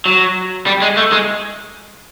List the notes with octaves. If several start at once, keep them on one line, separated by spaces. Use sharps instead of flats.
F#3
G3
G#3
A3
G#3